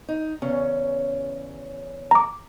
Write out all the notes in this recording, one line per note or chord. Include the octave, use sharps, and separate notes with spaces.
D#4
E2 C#3 C#4
A#5 D6